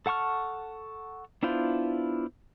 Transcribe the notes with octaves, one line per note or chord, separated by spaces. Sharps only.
A4 F#5 A5 C#6 F6
B3 D4 E4 F4 C5